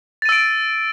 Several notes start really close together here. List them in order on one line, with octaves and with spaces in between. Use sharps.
A6 D#7 E6 D7